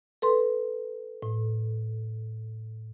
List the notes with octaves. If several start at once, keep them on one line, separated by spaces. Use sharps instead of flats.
A4 B4 C6
A2